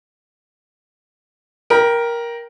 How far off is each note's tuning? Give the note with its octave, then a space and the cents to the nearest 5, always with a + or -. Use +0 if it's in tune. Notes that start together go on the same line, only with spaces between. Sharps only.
A#4 +10 G5 +0 B5 -25